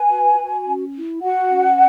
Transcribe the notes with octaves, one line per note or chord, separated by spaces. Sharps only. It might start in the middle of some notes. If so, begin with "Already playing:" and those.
Already playing: B4 G#5
F#4
F#4
C#4
E4
F#4 F#5
C#4